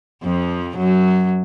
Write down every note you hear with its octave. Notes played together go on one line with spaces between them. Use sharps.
F2 F3
F#2 F#3